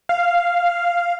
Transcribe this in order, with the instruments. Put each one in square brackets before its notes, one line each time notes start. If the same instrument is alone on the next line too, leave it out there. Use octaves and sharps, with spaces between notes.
[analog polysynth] F5